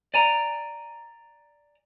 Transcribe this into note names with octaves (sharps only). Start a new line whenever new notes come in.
D5 G#5 A#5